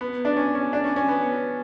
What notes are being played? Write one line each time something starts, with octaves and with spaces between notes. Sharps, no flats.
B3
D4
C#4
C#4
D4
C#4
C#4
B3